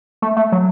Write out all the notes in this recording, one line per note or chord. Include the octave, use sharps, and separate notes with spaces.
A3
A3
F#3